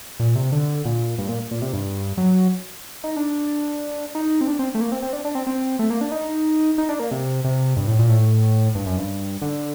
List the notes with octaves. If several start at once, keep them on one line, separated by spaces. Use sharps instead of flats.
A#2
C3
D3
A#2
G2
A#2
A#2
C3
G2
F#3
D#4
D4
D#4
C4
D4
C4
A3
A#3
C4
C4
D4
D4
C4
C4
A3
A#3
D4
D#4
D#4
D4
A#3
C3
C3
G2
A2
A#2
A2
G2
F#2
G2
D3